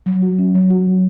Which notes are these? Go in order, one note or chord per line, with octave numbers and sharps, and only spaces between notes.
F#3
F#4
C#4
F#3
F#4
F#3